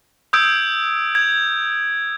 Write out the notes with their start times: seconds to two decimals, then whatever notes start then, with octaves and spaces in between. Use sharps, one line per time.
0.33 D#6 E6 G6 G#6 D7
1.15 G#6